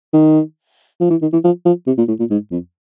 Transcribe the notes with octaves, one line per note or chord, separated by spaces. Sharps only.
D#3
F3
E3
D#3
E3
F3
F3
C3
A#2
A2
A#2
G#2
F2